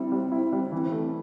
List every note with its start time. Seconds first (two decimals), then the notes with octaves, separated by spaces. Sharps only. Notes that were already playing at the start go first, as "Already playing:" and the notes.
Already playing: G3 C4 E4
0.12 G3
0.32 E4
0.53 G3
0.72 E3
0.92 A3